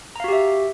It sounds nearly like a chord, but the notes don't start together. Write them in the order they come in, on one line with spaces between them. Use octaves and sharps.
A#5 F5 F#4 G4 E5